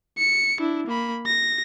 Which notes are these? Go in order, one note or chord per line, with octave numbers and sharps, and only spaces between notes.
C#7
D4 E4
A#3 B5
A#6